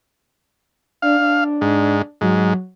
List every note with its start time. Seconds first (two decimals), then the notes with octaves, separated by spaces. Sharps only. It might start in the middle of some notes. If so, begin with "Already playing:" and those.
1.02 D4 F5
1.19 D4
1.61 G#2
2.21 G#2 F#3